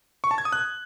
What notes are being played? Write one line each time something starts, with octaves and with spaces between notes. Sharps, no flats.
C#6
A5
G#6
D#6
F#6